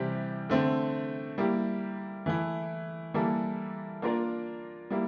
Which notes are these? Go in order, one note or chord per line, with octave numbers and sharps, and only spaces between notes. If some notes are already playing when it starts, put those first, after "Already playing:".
Already playing: C3 E3 G3 C4 G4
D3 A3 C4
G3 A#3 E4 G4
E3 A3 E4
E3 G3 A#3 E4 A4
A#3 D4 F4 A#4 D5
G3 A#3 E4